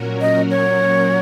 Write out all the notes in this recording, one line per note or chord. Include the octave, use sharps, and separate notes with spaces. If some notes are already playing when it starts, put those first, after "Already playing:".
Already playing: A#2 F#3 C#4 F#4 A#4
D#5
C#5